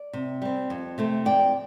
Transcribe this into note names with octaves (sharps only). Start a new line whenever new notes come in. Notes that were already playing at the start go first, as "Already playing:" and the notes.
Already playing: D5
C3
G3 C4
F2
C3 A3 C4
F2 D5 G5